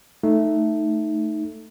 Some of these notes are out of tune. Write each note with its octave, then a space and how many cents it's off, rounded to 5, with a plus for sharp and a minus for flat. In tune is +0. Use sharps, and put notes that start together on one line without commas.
A3 +0 D#4 +0